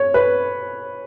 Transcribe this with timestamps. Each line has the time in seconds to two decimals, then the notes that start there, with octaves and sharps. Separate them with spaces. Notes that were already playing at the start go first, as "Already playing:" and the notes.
Already playing: C#5
0.14 B4